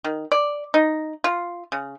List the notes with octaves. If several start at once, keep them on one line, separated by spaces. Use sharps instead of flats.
D#3
D5
D#4
F4
C#3